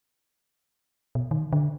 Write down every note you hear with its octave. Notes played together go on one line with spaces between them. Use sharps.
B2
D#3
D3